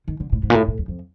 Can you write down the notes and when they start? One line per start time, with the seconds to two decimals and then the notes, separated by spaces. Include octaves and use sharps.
0.08 D#3
0.20 D3
0.32 A2
0.43 G#2
0.50 A#2
0.55 A2
0.68 A2
0.79 E2
0.88 F2